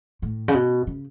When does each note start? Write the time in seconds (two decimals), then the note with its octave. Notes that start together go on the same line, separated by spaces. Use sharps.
0.22 A2
0.48 C#3
0.54 B2
0.87 C#3